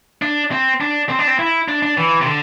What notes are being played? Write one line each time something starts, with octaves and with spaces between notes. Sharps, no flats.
D4
C4
D4
C4
D4
C4
E4
D4
D4
E3
C3
D3